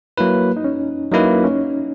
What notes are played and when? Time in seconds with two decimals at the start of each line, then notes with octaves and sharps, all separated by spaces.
0.18 F#3 A#3 E4 B4
0.57 D#4
0.64 C#4
1.12 F#3 A#3 D#4 E4 B4
1.44 C#4